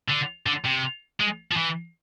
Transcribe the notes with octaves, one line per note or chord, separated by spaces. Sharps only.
D3
D3
C3
G#3
F3
E3